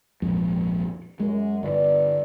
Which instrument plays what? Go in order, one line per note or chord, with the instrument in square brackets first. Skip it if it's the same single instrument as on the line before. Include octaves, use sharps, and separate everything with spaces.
[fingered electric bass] A#1 F2 G#2
[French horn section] F#2 [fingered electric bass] G#3
[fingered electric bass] G1 [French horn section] E4 B4 D5